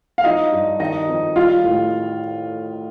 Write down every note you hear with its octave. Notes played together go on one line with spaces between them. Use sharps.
F5
F3 D#4 D#5
G2
D#3 D#4 D#5
F2
G3 F4 F5
A2